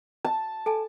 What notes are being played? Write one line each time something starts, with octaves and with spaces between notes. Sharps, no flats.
A5
A4 G#5 A5